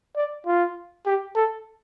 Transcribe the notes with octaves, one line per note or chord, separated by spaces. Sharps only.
D5
F4
G4
A4